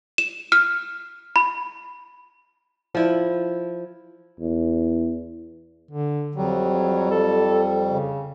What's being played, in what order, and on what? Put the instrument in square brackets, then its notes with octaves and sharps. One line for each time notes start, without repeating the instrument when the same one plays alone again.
[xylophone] E7
F6
B5
[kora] F3 E4
[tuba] E2
[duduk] D3
[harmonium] F2 G3 [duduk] F#3
[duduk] A4
C#3